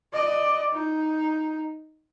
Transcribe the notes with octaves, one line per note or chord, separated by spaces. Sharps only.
D5 D#5
D#4